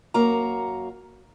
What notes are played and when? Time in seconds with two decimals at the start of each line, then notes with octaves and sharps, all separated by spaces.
0.14 F#2 A#3 F#4 A#5